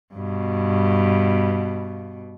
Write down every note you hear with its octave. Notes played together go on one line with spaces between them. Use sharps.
G2 B2